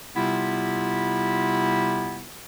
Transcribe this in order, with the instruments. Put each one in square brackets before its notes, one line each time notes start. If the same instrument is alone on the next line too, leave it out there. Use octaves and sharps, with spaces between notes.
[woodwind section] C3 G3 B3 E4 F4